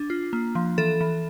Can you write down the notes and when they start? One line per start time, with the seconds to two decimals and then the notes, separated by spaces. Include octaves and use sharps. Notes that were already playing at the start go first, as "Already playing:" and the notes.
Already playing: D4
0.10 F4
0.33 A#3
0.55 F3
0.78 E3 A4
1.01 E3